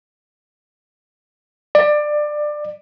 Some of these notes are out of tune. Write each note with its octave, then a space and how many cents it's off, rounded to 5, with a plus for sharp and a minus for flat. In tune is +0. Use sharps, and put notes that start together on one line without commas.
D5 +20